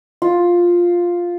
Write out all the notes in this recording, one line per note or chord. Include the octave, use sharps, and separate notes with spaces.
F4